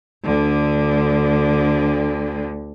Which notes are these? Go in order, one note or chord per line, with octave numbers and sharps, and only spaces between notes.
D2 D3